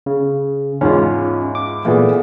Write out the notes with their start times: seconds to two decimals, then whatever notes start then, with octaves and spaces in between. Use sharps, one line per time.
0.06 C#3
0.81 E2 G#2 C#4 F4
1.55 D6
1.85 A#2 E3 A3 B3 G#4